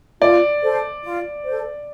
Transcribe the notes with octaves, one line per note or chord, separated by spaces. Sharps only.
F4 D5
A4 C5
F4
A4 C5